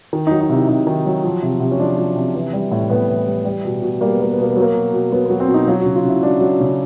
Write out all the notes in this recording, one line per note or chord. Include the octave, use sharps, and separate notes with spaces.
D#3
D#4
F#3
D#4
C3 E4
C3 D#4
D#3
F#3
F3
C3
C3
C#4
F3 D4
F3
C3
E3
G3
A2
A2 B3
E3
G3
G3
B2
B2
G3 A#3
B3
G3 A#3
B3
B2 A#3
B3
F#3
A#3
B2
B2
F#3 B3
B3
F#3
C4
B2
D#4
F#3 F4
F#4
C#3
F4
C#3 E4
F#3 D4
F#3
C#3